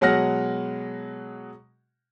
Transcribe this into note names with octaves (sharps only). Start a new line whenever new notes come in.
B2 F#3 G#3 F#5 F6 A#6